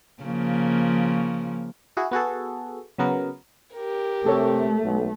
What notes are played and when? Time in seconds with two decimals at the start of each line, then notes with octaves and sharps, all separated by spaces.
0.23 C#3 F3 A#3
1.97 E4 F#4 G#4
2.11 B3 F#4 G#4 A4
2.98 C#3 F#3 B3 A#4
3.74 G4 A#4
4.26 C3 A3 A4 C#5
4.84 B1